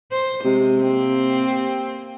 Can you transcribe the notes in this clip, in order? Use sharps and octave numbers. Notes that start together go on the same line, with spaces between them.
C5
C3 G#3
A#3 C4